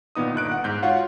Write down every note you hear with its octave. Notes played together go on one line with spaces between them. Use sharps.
A#2 D#3 B3 D#4 D#6
G1 D#4 F#6 D7
F#5 F#6
G#2 G6
F4 F#4 C#5 F5 F#5